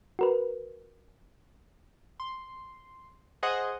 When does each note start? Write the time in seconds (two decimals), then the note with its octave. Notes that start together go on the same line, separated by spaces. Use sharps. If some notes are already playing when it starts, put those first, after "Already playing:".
0.19 F#4 A#4 B4
2.20 C6
3.43 G#4 C5 D#5 F#5